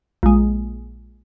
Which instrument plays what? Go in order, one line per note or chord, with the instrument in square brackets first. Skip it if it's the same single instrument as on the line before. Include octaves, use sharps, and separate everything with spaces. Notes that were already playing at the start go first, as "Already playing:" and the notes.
[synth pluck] A#1 G#3